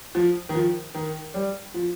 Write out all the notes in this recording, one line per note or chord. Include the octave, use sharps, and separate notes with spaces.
F3
D#3
F3
D#3
G3
F3